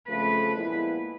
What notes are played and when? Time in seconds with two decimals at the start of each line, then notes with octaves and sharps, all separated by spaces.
0.08 F2 C#3 F3 A3 B4
0.53 A#2 F3 G#3 B3 E4